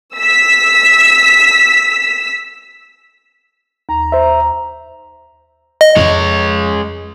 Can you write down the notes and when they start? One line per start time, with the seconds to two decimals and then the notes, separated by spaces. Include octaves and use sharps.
0.18 E6 B6
3.89 D#2 A#5
4.12 C5 E5
5.81 D#5
5.97 F2 G#3 C#5